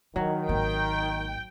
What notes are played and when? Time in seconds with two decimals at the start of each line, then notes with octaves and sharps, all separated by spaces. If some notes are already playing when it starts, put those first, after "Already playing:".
0.16 D#3 F#3 E4
0.49 G#1 A#3 G5